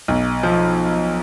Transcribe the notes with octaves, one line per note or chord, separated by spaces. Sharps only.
B1
F3